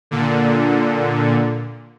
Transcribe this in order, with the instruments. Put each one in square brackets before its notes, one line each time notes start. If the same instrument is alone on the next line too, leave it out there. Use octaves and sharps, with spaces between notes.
[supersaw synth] A#2 D3